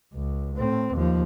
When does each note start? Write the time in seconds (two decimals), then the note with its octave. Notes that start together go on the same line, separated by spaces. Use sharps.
0.14 C#2
0.57 A2 C4
0.94 D#2 F3